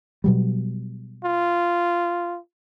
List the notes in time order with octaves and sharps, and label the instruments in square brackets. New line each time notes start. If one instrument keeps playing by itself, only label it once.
[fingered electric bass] B2 F#3 G3
[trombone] F4